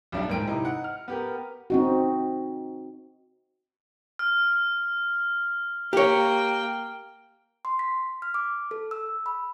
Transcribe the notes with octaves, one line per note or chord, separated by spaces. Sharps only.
B1 G3 D4 E5
D1 A#1 G#2 A#4 G5 D7
C3 D#4 E4
F#5
F6
B3 G4 A#4
C4 D#4 F#4
F6
A#3 G4 C#5 G5
C6
B6
F6
D6
A4
E6
B5